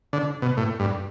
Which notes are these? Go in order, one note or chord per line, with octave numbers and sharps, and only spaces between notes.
D3
B2
A2
G2